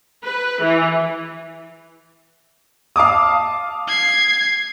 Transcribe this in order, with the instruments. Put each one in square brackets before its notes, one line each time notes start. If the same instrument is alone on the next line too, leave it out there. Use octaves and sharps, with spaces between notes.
[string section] B4
E3
[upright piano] F5 A5 D6 D#6
[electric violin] G#6 C7